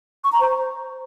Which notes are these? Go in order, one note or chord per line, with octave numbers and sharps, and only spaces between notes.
C#6
A#5
C5